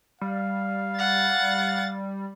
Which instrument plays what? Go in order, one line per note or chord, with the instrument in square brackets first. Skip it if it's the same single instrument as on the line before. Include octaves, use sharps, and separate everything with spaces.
[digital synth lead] G3 [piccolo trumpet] F5
[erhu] F#5 [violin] A6